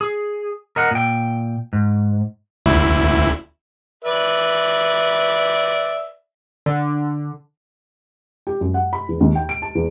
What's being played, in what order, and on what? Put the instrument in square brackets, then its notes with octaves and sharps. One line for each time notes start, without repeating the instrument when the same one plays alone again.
[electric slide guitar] G#4
A#4 D#5 F#5
A#2 G5
G#2
[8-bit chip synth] D2 E4
[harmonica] B4 D5 E5
[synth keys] D3
[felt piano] G4
F#2
F#5
B5
E2
D#2
G5
D7
A5
E2